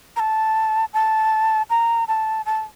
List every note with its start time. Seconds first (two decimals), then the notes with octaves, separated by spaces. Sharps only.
0.16 A#5
0.20 A5
0.94 A5
1.70 A#5
2.08 A5
2.46 A5